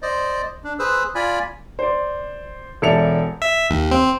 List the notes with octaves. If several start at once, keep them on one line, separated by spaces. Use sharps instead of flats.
C5 D5 D#5
D4
G#4 B4 C5 E6
F4 D5 G#5 B5
C5 D5
E1 A4 D5 E5 C#7 F7
E5
D#2
C4